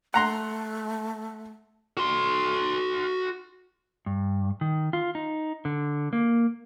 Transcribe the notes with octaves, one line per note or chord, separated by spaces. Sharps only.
A3 F#5 A#5 C6
F#4 C6
G2
D#3
F4
D#4
D3
A#3